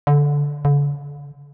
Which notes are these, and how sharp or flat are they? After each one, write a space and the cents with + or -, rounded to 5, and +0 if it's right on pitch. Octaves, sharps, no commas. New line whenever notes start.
D3 -15
D3 -40